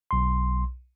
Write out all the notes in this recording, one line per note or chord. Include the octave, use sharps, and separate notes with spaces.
B1 C6